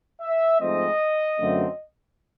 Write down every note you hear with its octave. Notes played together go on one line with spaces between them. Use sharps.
E5
G#2 F3 A3 C4 D#5
F#2 D3 F#3 A3 C4